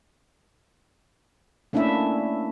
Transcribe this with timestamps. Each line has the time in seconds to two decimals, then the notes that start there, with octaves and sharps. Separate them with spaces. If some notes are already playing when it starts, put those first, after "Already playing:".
1.73 A3 A#3 C#4 D4 E4 E5